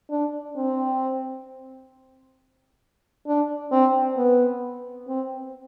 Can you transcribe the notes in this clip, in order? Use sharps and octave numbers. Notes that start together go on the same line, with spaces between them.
D4
C4
D4
C4
B3
C4